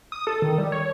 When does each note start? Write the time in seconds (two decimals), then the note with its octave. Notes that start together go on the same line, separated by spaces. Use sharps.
0.12 D#6
0.27 A4
0.42 D#3
0.58 G3
0.72 C#5